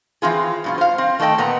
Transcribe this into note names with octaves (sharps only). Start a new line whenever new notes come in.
E3 C4 F4 G#4
G2 B2 F4
C5 F5
C4
D#3 A3 A4 D5 D#5 G5
A#2 B3 F#5 A#5